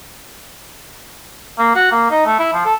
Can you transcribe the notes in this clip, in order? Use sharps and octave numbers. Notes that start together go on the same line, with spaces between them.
A#3
F#4
A#3
D#4
A3
E4
F3
A4